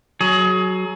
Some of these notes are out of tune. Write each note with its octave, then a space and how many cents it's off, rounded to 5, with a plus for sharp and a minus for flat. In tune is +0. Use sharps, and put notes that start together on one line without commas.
F#3 +5 G#4 +30